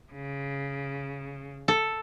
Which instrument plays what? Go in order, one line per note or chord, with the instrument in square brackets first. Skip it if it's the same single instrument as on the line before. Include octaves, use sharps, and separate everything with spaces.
[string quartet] C#3
[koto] A4